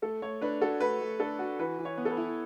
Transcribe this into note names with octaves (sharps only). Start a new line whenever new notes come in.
A3 A4
A3 C#5
D4 B4
F#4 A4
A3 B4
A3
D4 A4
F#4
E3 B4
E3
C#5
B3
A4
B4
E4